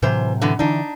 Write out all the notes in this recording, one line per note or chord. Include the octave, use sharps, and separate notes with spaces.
A2 C3 E3 F#3 C5
D3 E3 B3
D3 E3 D4 D#4